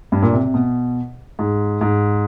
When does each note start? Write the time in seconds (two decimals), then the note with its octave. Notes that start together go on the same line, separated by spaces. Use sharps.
0.12 G2
0.22 A#2
0.33 C3
0.44 C3
0.54 B2
1.39 G#2
1.81 G#2